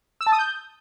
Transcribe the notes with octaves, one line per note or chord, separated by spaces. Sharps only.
E6
A5
D#6
G6